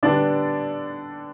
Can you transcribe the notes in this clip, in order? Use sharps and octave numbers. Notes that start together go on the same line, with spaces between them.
D3 G3 B3 D4 D5